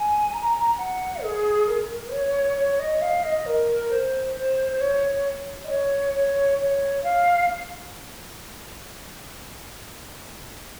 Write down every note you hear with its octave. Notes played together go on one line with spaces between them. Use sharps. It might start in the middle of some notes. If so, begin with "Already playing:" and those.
Already playing: G#5
A#5
F#5
G#4
A#4
C#5
C#5
D#5
F5
D#5
A#4
C5
C5
C5
C#5
D#5
C#5
C#5
C#5
F5